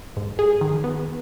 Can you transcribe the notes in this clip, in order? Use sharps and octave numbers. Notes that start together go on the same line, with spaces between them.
G#2
G#4
D#3
B3